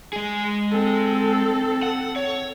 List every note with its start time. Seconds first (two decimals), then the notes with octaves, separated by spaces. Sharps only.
0.13 G#3 G#4
0.71 C4 A4
1.82 F#5
2.16 C#5